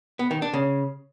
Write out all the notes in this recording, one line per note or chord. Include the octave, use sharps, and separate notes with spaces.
B3
D#3
D4
C#3